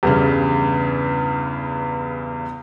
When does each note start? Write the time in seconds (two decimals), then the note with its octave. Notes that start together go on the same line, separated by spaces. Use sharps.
0.03 E2 G2 C#3